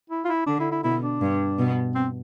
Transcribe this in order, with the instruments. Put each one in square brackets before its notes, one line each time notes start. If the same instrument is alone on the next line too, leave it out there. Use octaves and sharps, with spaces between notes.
[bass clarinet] E4
F4
E4
[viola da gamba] D3 [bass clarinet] D4
[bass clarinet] E4
E4
[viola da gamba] B2 [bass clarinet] E4
[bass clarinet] D4
[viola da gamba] G2
B2
[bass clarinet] C4